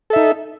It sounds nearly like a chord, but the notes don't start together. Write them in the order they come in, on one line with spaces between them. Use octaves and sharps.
A4 E5 D#4